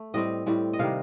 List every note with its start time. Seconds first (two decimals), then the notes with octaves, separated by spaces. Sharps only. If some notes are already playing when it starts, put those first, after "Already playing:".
Already playing: A3
0.14 A2 G3 C4 D#5
0.46 A2 G3 C4
0.73 D#5
0.79 C3 D#3 G3 F5